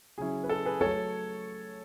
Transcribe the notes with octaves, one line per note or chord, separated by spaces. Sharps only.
C#3 F#3 C#4 E4 G#4
B4
A4
G#4 B4
F#3 A3 A4 C#5